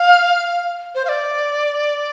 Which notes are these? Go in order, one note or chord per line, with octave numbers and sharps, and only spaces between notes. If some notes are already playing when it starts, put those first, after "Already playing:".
Already playing: F5
C5
F5
D5